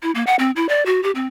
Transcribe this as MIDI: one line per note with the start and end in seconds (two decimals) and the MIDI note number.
0.02 0.11 64
0.15 0.23 58
0.27 0.35 78
0.39 0.51 60
0.56 0.67 64
0.69 0.85 74
0.86 1.02 66
1.03 1.11 67
1.15 1.27 60